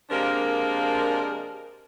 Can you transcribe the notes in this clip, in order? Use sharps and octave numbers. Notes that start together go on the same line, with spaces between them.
C3 F3 G#3 A#3 D4 A#4